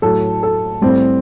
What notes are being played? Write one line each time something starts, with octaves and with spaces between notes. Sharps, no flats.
A2 F#3 A4
A4
A2 G3 C4